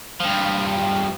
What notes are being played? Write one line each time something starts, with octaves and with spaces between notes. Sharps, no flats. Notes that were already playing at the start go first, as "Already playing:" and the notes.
G2 F3